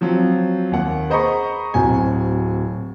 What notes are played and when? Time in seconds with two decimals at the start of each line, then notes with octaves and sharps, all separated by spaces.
0.01 F3 F#3 C4 F4
0.71 D#2 F#5
1.10 G#4 C5 D#5 A#5 B5 C#6
1.74 D1 C4 F#4 G#5